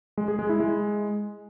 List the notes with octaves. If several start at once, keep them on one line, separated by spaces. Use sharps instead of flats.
G#3
G#4
G#3
E4
G#3